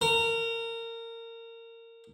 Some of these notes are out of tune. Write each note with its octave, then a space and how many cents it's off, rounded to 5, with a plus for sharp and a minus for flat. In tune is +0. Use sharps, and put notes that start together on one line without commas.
A#4 -25